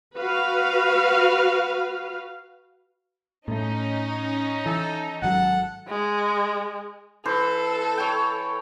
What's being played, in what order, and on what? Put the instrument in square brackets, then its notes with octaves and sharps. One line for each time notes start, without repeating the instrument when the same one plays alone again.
[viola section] F#4 B4 F5
[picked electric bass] A2 A3 [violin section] C#4 D#4
[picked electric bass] E3 [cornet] A4
[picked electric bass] G#1 F#3 [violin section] A4 [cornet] F#5
[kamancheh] G#3
[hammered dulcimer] E3 C5 [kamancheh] A4
[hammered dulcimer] C#5 G5